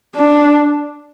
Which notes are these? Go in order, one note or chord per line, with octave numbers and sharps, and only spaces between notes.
D4